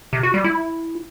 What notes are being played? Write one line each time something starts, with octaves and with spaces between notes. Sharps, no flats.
C3
F#4
G3
E4